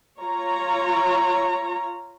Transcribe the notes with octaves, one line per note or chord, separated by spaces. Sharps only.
F4 C#5 A#5